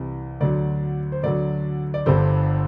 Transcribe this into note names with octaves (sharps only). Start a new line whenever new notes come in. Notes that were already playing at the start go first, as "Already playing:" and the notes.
Already playing: C2 C3 E3
D2 D3 F#3 D5
C5
D2 D3 F#3 D5
D5
G1 G2 D3 G3 C5